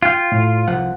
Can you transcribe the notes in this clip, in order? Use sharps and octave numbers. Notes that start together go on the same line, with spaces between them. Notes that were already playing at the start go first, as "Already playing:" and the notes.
F4 F5 G5
A2
C2 F3 F#5